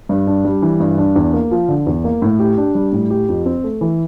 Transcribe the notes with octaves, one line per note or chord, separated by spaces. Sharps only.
G2
D4
G3
E3
G2
D4
E2
A#3
F3
D3
E2
A#3
A2
G4
D4
G3
A2
G4
F2
C4
A3
E3